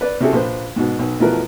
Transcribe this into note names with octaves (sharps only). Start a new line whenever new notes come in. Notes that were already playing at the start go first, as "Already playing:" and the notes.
B4 D5
C3 C#4 E4 F#4 G#4 A4
A#1 B4 C5
G#2 B2
B1
B2 E3 F3 A3 A#4 B4